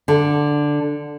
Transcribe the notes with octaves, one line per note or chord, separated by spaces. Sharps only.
D3